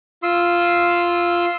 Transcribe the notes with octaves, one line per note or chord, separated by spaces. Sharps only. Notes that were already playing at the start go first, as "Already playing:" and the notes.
F4 C6 E6